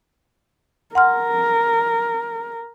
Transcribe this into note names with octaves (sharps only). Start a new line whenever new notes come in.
A#4 F#5 C6 F6